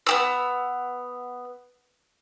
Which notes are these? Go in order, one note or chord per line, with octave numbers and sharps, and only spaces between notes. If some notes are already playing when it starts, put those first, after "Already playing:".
B3 G4 E6